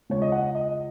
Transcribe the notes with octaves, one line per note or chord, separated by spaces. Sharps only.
C#2 C#3 G#3 C#5
D#5
F#5
D#5